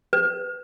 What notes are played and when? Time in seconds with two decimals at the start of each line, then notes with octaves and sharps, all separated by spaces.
0.13 B4